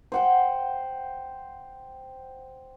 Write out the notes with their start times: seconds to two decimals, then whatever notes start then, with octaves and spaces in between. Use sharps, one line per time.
0.12 C5 F#5 G5